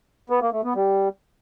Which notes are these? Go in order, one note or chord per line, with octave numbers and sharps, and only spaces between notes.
B3
A#3
A3
B3
G3